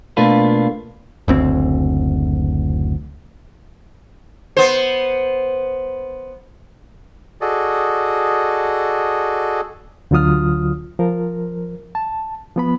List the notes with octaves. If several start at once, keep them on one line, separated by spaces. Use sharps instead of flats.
B2 A3 A#3 D4 F4 B4
F#1 D2 C4
B3 C5
F#4 G#4 A4 D5 D#5
D2 D3 F#3 F4 D#6 F6
F3 A#4
A5
F3 B3 B5